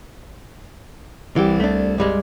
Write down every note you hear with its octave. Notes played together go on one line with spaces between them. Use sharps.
C2 E3 G4
A3 D4
G2 G3 G#3